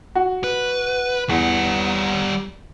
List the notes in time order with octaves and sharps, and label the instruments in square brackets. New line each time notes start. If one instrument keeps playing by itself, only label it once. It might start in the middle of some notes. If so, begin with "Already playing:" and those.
[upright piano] F#4
[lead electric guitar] B4
[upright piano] E2 [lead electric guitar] G3 F#5